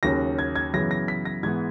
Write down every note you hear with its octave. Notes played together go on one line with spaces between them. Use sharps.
D#2 C#3 F#3 A#3 C#4 A#6
G#6
G#6
F#2 C#3 E3 B3 A#6
A#6
B6
A#6
G#2 E3 G#3 B3 G#6